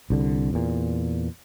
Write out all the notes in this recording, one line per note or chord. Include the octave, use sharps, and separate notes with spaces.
C2 D3
E2 A#2